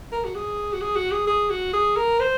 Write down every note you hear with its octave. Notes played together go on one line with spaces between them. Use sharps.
A#4
F#4
G#4
F#4
G#4
F#4
G#4
G#4
F#4
G#4
A#4
C5